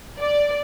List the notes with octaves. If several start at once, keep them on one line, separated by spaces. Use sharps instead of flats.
D5